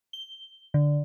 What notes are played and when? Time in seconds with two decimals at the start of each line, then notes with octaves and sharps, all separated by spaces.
0.13 G7
0.74 D3